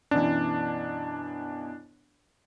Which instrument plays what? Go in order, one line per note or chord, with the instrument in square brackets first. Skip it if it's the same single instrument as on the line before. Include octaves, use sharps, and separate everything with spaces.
[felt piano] F#2 B2 E3 [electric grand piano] D4